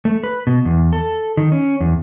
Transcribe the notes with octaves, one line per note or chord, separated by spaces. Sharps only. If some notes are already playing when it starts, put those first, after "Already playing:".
A3
B4
B2
E2
A4
D#3
C#4
E2